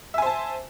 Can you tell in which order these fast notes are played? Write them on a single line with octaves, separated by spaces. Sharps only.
E5 G#5 C5 A5